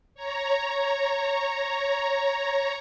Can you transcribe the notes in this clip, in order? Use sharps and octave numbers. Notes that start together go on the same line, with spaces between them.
C#5 A#5